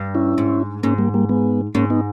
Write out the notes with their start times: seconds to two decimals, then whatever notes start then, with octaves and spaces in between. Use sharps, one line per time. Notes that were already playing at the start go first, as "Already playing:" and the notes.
Already playing: G2
0.15 C#4 E4
0.38 G#2
0.83 G#2 A#3 C#4
0.98 G3 A#3
1.14 G3 A#3
1.29 G#3 B3
1.75 G#2 A#3 C#4
1.90 B3 D#4